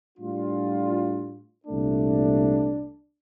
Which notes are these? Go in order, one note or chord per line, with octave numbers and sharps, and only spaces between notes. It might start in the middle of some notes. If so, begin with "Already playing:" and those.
A2 G3 D4 F4
C2 A#2 A3 D4